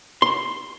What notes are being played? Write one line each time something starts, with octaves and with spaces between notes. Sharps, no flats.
C6